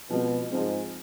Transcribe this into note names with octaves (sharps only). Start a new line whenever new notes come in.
B2 F3 G#3 C4
G#2 F3 G#3 C4